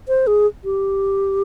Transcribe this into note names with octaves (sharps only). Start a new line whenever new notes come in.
C5
G#4
G4